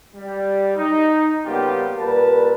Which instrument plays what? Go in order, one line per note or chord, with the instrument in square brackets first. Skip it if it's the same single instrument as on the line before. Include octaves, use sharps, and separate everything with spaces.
[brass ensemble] G3
D#4
C#3 G3 A#3 B3 F4 G4
A#2 G3 A#4 B4 A5